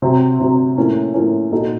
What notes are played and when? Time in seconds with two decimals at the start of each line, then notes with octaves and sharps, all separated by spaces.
0.02 C3 F#3 C4
0.39 C3 F#3 C4
0.78 A2 F3 A#3 C#4
1.14 A2 F3 A#3 C#4
1.52 A#2 A3 D#4 F#4 A4